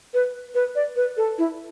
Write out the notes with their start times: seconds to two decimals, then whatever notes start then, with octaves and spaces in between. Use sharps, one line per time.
0.14 B4
0.55 B4
0.75 D5
0.96 B4
1.17 A4
1.38 E4